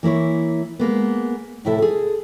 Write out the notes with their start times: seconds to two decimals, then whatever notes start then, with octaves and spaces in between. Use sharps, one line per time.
0.03 E3 A#3 E4 C#5
0.79 G#3 A#3 B3
1.65 A2 C3 E4 A4 E5
1.78 G#4 A4